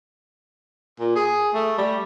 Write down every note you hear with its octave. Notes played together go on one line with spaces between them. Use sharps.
A#2
G#4
A3
G3